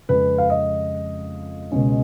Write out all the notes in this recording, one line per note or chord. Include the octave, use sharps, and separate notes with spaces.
F2 C#3 G#3 C#4 B4
F5
D#5
C#2 B2 G#3 C#4